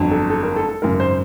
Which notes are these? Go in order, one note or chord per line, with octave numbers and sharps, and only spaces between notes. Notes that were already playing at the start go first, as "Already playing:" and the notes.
Already playing: G1 F2 D3 F#3
A4
A4
A#4
A4
A4
G#1 F#2 C#3 A#4
C5